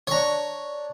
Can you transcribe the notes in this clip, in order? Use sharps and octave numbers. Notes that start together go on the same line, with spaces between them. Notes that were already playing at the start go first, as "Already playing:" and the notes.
D4 C#5 A#5 C#6